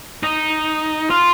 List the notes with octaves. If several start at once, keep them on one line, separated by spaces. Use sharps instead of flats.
D#4
F4